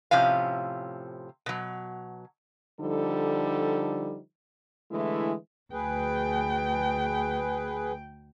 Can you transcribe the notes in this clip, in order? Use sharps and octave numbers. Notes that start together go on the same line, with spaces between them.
A2 C3 F3 C#4 F5
B2 F#3
D3 F3 G3 D#4 A4
D3 E3 G#3 A3 E4
D2 G#4 B4 G5